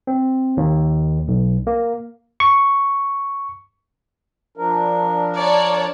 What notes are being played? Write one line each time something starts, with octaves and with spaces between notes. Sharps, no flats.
C4
D#2
B1
A#3
C#6
F3 D4 A#4
C#5 D5 A5